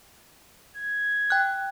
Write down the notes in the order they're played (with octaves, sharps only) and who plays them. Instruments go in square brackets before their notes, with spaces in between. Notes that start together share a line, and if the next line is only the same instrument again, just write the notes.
[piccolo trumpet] G#6
[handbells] G5 F#6